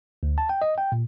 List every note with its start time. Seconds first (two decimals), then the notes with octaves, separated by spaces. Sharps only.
0.23 D2
0.38 A5
0.49 G5
0.62 D#5
0.78 G5
0.92 A#2